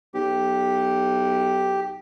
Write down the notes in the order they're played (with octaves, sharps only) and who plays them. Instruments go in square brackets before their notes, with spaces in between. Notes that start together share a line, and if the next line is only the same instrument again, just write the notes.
[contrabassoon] B1 [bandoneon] G4